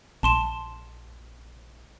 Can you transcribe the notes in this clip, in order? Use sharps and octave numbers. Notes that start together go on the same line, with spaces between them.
A#1 A5 C6 E7